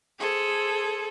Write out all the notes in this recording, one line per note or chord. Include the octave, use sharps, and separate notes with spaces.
G#4 A4 C5